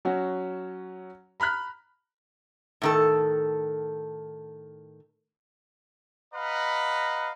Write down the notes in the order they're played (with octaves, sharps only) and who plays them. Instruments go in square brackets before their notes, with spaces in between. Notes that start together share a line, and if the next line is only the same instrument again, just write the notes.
[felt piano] F#3 C#4 F#4
A#5 B5 F6 F#6 B6
[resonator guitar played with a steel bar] A2 D#3 A4
[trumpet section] B4 D#5 F5 F#5 A#5 B5